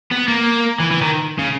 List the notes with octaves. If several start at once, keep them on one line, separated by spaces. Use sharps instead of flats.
B3
A#3
E3
E3
D#3
C#3